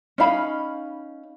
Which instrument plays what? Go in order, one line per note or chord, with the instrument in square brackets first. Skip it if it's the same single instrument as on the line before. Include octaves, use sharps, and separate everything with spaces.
[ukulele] C#4 D#4 F5 B5